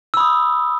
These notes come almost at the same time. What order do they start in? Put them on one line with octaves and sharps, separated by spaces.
E6 B5 D#6